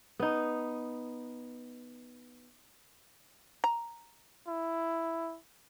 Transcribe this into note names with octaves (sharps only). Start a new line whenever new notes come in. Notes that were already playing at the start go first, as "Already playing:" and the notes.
B3 D#4
A#5
E4